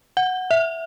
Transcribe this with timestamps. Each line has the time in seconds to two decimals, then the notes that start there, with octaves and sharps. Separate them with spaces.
0.17 F#5
0.51 E5